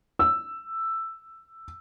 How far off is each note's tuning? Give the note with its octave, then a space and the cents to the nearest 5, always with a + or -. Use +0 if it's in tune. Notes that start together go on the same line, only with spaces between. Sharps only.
E6 +5